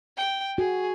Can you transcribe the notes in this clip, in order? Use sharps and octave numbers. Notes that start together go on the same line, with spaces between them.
G5
F#4 G#4